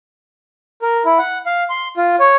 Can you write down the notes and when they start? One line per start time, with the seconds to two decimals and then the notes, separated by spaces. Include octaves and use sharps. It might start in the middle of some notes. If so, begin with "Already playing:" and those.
0.82 A#4
1.05 E4
1.18 F#5
1.46 F5
1.70 C6
1.97 F4
2.20 C#5